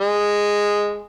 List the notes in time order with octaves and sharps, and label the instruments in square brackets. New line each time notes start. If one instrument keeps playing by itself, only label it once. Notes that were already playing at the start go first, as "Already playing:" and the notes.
[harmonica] G#3